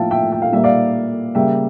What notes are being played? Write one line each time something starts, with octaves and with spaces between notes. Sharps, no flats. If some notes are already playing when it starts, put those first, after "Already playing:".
Already playing: A2 F3 A#3 E5 F5 G5 A5
E5 G5
G5
F5
A#2 G3 A#3 E5
D5 F5
C#3 G3 A#3 E5 G5